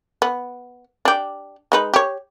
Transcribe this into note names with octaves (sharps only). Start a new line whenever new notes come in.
B3
D4 G4
G#3 D#4 B4
G4 C#5